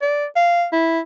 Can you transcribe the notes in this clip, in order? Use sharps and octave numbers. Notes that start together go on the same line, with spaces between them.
D5
F5
E4